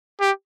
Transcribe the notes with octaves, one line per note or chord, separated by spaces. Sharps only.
G4